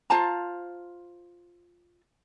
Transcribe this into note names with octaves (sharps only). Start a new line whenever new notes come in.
F4 C5 A5 A#5